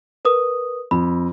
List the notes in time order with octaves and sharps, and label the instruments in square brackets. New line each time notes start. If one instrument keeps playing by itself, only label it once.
[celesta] A#4 B4 D#6
[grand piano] F2 [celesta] B5